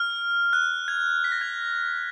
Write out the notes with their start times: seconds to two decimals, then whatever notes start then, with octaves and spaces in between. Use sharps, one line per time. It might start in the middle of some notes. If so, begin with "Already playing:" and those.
Already playing: F6
0.53 F#6
0.88 G#6
1.24 B6
1.32 A#6
1.41 G#6